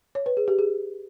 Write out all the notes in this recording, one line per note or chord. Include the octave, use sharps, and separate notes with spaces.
C#5
B4
G#4
G4
G#4